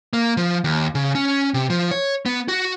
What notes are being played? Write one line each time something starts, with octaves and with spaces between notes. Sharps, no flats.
A#3
F3
D#2
C#3
C#4
C3
F3
C#5
B3
F#4